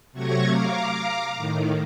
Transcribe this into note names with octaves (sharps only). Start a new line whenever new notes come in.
C3 F#3 A3 C#6 G#6 A#6
F5 A#5 D6
A2 D#3